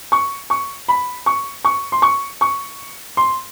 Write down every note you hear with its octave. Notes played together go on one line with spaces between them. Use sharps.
C#6
C#6
B5
C#6
C#6
C6
C#6
C#6
C6